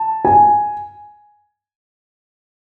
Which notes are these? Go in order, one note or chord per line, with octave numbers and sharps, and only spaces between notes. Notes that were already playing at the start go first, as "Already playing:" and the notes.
Already playing: A5
G#5